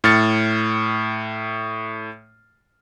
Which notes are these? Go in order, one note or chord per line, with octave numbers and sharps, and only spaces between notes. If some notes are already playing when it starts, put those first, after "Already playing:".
A2 F6 A6 C#7